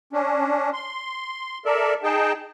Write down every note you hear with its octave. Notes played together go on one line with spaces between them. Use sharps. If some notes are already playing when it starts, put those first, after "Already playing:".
C#4 D4
C6
A4 A#4 D5 E5
D#4 G#4 G5 A5